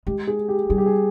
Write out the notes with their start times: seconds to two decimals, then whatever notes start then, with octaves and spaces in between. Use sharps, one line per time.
0.07 G#3 G4
0.27 G#4
0.49 G4
0.69 G3 G#4
0.78 G4
0.86 G#4